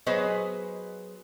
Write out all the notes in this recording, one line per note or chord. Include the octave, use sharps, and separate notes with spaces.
F#3 B3 G#4 B4 C5 D#5